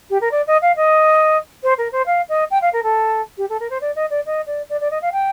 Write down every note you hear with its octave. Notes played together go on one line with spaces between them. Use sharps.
G4
A#4
D5
D#5
F5
D#5
C5
A#4
C5
F5
D#5
G5
F5
A#4
A4
G4
A4
A#4
C5
D5
D#5
D5
D#5
D5
D5
D5
D#5
F5
G5